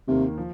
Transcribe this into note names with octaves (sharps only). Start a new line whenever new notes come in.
D#2 C3 D#3 A#3
F3